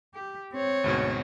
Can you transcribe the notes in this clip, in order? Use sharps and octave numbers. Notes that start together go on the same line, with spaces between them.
G4
C4 C#5
D2 G#2 B2